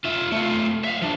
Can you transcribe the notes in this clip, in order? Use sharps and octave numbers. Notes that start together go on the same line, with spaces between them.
F4 E5
A3 F4
E5 F5
F3 D4